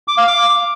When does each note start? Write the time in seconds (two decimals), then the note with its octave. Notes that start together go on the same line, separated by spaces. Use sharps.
0.08 D6
0.18 F5
0.27 D6